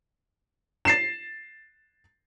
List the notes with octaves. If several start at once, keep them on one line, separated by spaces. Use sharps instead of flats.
A6 C7 E7